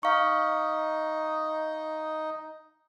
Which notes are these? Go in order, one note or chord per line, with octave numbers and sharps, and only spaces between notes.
D#4 F5 C#6